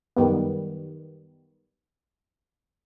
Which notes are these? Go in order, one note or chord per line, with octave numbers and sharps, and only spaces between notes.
F#2 D#3 G3 B3